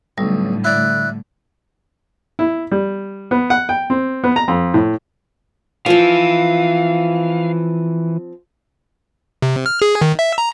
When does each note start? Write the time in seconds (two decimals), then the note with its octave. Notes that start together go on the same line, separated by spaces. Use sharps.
0.18 B1 A2 D3 G3
0.64 E4 D5 F#6
2.39 E4
2.72 G3
3.31 B3
3.50 F#5
3.69 G5
3.90 C4
4.24 B3
4.36 A#5
4.48 F2
4.74 A2
5.86 E3 F3 C4 F5
9.42 C3
9.66 F6
9.82 G#4
10.01 D#3
10.19 E5
10.38 A#5